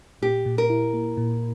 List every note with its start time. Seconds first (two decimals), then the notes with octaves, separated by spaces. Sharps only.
0.22 A#2 G4
0.46 A#2
0.58 A#4
0.70 E4
0.94 A#3
1.17 A#2